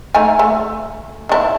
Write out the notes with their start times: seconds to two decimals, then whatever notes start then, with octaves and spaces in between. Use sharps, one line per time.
0.15 A3 D#4 G#5
0.39 A3
1.29 D#3 D4 E4